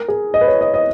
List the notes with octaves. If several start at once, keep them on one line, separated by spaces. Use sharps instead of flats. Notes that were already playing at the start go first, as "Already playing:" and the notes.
Already playing: A#4
G#4
D#5
B4
C#5
D#5
D#5